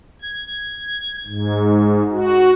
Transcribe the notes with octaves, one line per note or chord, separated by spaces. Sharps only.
G#6
G#2
F#4